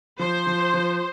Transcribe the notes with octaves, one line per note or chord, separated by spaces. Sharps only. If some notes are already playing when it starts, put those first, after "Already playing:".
F3 C5
F3
F3